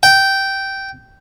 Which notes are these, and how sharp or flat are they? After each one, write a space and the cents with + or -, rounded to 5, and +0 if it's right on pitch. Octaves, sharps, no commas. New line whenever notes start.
G5 -10